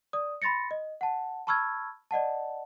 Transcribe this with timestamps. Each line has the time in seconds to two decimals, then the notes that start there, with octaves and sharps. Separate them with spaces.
0.13 D5 D#6
0.42 B5 C6 A6 A#6 C#7
0.71 D#5
1.01 F#5 A5
1.47 A5 B5 C#6 E6 F6 G#6
2.11 D5 D#5 F#5 A5